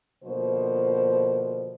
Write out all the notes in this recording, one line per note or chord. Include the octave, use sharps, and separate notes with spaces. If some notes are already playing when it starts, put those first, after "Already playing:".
B2 D3 F3 A#3 C5